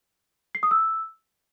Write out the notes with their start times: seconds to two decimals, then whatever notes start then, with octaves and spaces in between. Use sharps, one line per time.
0.55 C7
0.63 D#6
0.71 E6